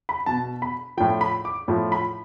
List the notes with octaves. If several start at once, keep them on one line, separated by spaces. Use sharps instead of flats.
B5
B2 A5
B5
A2 F3 G5
B5
D6
A2 F3
B5